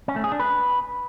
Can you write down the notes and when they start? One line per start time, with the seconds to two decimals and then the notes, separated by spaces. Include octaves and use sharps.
0.08 C#4
0.16 A3
0.24 G#4
0.32 D4
0.40 B4